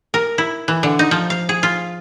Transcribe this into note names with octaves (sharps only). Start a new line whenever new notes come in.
A#4
E4
E3
D3
D#4
F3
F5
G#4
F4